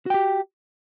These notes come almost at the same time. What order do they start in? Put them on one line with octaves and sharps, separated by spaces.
F#4 G5 G4